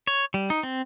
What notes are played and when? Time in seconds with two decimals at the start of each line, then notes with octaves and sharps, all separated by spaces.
0.07 C#5
0.34 G3
0.50 D#4
0.63 C4